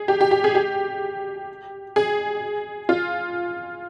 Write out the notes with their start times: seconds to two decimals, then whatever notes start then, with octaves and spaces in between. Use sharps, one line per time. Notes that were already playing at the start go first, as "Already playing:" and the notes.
Already playing: G#4
0.08 G4
0.21 G4
0.31 G4
0.44 G#4
0.55 G4
1.96 G#4
2.89 F4